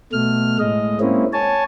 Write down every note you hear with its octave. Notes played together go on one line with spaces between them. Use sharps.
B2 A3 F6
A2 G#3 D#5
G#3 A#3 C4 C#4 E4
C#5 G#5 A5